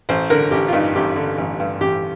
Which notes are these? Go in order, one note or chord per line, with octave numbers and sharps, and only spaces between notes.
A1 C5
D3 A#4
A1 G4
F4
G2 D#4
A1 G4
D3
A1
G2
A1 G4